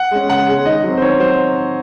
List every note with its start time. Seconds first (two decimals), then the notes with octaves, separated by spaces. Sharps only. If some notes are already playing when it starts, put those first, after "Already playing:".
Already playing: F#5
0.11 G#3 C#4
0.30 C#3 F#5
0.48 G#3 C#4
0.66 D#3 D#5
0.84 F#3 C4
0.97 C5
1.02 D#3 C#5
1.20 F#3 C5